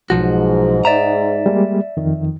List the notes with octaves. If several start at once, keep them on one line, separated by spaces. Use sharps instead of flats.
B1 G#2 F3 F#4
D#4 D5 E5 A#5
G3 G#3 A#3
F2 D#3